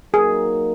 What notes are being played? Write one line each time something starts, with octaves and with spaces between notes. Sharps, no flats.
F#3 A#3 D#4 G#4 A#4